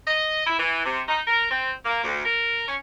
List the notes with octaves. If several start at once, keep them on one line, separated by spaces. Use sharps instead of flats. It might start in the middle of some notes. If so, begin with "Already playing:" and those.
D#5
E4
E3
C3
D#4
A#4
C4
A#3
D2
A#4
C#4